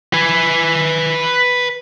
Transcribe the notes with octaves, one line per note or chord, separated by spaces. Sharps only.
B4 G#5